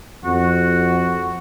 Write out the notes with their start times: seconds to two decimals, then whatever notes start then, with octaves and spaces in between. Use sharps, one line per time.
0.24 F2 F#4